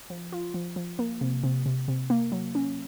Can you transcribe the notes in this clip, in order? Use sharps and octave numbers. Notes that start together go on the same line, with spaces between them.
F3
F4
F3
F3
A#3
C3
C3
C3
C3
A#3
F#3
C#4